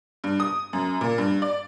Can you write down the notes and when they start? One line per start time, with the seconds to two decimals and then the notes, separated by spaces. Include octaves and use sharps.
0.24 G2
0.40 D#6
0.73 F#2
1.01 A#2
1.18 G2
1.42 D5